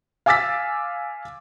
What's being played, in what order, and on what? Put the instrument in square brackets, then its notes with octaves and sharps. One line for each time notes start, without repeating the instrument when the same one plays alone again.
[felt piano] F5 G#5 D6 E6 A6 B6